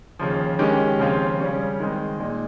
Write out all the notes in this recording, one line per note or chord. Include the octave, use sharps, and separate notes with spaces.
D#2 C#3 F3
D#3 G#3 C#4 G4
D#2 C#3 F3 C4 F4
C#3 G3 C#4
D#3 G#3 C4 D#4
A#2 G#3 D#4